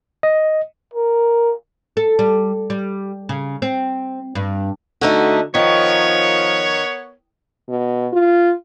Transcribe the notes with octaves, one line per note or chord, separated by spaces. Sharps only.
D#5
A#4
A4
G3
G3
C#3
C4
G2
D3 A3 D#4 F#4
D#3 F3 B3 A#4 C#5
B2
F4